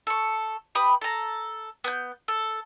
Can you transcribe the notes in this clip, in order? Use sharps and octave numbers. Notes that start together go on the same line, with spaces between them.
A4 C#6
G4 B4 B5 D#6
A4 A#5
B3 G6
A4